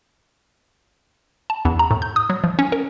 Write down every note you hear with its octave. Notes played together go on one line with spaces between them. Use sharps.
A5
E2
A#5
A2
G6
D#6
F#3
F3
C#4
A#4